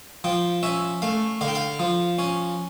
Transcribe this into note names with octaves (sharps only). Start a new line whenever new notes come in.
F3 G5
C#4 E5
A3 F5
D3 F5
G5
F5
F3
C#4